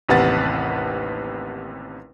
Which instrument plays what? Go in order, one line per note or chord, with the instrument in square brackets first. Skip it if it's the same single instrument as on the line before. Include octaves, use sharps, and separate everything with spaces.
[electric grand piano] A1 D#2 C3 B4 F#5 A6